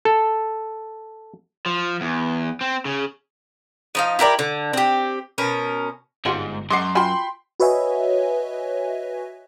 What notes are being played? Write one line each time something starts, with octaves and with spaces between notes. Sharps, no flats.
A4
F3
E2
C4
C#3
F3 D#4 F5
E4 G4 A#4 D5
D3
C4 G4
B2 C#4 A#4
G1 G#2 G3 F4 F#4
F#2 G#3 F#5 C6 D6 C7
F4 F#4 G5 G#5 B5 C6
F#4 B4 C#5 D#5 E5 G#5